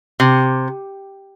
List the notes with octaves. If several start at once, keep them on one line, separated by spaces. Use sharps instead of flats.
C3